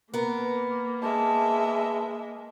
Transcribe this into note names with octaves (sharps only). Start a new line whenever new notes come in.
A#3 B3 A#4
G#3 E5 A5